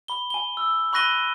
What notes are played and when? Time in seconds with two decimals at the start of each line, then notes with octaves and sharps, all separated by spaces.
0.08 B5 G7
0.30 G#5 G7
0.57 E6
0.93 B5 C#6 F#6 A#6 D#7 G7